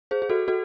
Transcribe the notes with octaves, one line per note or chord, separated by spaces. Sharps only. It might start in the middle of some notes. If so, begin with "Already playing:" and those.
G#4 C5
G#4
F#4 A4
F#4 A4